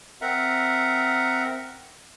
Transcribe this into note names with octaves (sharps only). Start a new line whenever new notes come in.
C4 A#4 E5 F#5 A#5